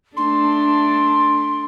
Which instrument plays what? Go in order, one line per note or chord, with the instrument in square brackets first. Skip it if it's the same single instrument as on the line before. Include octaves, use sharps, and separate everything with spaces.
[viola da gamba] A3 D4 [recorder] C6